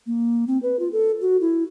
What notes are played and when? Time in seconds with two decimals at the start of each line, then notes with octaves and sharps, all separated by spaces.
0.07 A#3
0.47 C4
0.63 B4
0.80 F4
0.92 A4
1.21 F#4
1.41 E4